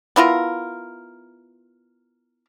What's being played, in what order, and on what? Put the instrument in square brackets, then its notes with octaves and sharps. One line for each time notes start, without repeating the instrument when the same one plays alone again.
[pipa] B3 E4 F4 A#4